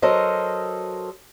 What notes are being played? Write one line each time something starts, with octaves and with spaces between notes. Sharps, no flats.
F#3 A4 A#4 C5 D#5